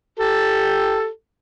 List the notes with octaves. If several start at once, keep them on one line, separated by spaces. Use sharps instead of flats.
G4 A4